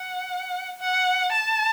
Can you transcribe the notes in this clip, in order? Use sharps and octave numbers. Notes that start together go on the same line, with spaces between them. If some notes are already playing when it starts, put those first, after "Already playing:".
Already playing: F#5
F#5
A5